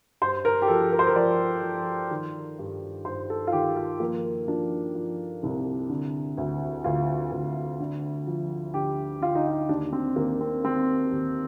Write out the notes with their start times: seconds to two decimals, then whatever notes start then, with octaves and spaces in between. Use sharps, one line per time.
0.22 G2 C5
0.45 A#4
0.62 G4
0.68 F3 A4
0.92 A#4
0.99 C5
1.07 A#4
1.16 F3 D5
1.63 F3
2.11 D#3
2.59 G2
3.05 G2 C5
3.30 A4
3.47 F4
3.52 D#3 G4
3.76 F4
4.00 F3 A#3
4.48 F3 D4
4.95 F3
5.43 C2
5.89 D3
6.37 D2
6.84 D2 F4
7.32 D2
7.80 D3
8.27 F3
8.74 D3 G4
9.21 D3 F4
9.35 D#4
9.48 F4
9.69 D#2 D4
9.93 C4
10.16 D#2 A#3
10.41 C4
10.64 D#3 C4
11.12 D#2